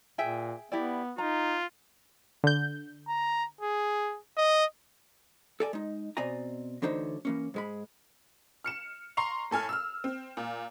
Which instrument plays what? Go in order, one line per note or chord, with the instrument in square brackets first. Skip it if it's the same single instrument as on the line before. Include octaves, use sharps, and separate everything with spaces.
[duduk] A#2 [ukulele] G#4 E5 G5
[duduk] B3 [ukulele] E4 G4 D5
[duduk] D#4 [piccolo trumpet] F4 [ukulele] A#5
[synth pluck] D3 G6
[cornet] A#5
G#4
D#5
[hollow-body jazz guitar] A4 D5 G#5
G#3 D#4
B2 C4 D5 D#5 G#5 A#5
D2 D3 E3 D#4 C5 C#5
E3 A#3 C#4
G#2 G#3 B5
[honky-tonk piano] F6 C#7 E7
A#5 C6 C#6 C7 F7
A2 A4 G#5 F6
E6 F6
C4
A#2